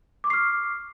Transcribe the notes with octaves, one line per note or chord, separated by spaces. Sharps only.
C#6 D6 F6 C7